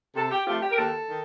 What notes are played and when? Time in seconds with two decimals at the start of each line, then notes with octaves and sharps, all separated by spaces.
0.15 C3 A4
0.30 G4
0.46 F3 A3 C4 F4 G4
0.61 G4
0.70 A#4
0.77 D#2 A4
1.08 D#3